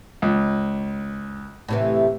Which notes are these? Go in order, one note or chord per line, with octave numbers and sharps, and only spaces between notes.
C#2
A2 C3 E3